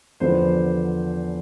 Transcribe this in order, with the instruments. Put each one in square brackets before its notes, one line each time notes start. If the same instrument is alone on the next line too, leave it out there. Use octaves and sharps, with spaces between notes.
[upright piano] E2 D3 F3 B3 D4 C5